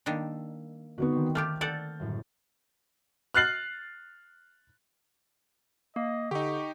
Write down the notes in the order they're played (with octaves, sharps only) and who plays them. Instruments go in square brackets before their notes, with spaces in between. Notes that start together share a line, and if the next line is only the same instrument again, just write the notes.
[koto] D#3 G3 D4 [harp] A#3 E6 B6
[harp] D3 C#6 [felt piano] B3 D#4 F#4
[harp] D#3 C4
[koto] A3 F4 G4 [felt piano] D6 F6
[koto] A4 D5 F#5 [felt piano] G6 A6
[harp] G1 F#2 A2
[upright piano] F6 F#6 A6 C7 F#7
[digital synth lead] A#3 [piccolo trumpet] D#5
[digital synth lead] D3 [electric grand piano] D#4 G4 [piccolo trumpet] C#6